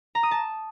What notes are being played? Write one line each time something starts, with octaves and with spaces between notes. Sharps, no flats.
A#5
D#6
A5